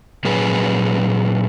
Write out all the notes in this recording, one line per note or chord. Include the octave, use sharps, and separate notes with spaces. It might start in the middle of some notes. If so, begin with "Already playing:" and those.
A#2 F#3 C#4 G#4 B4